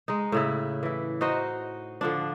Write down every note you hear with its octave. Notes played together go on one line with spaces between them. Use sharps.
G#3 D#4
A2 C#3 E4
E3 E4
D#4 F#4 C5 D#5
D3 F3 D4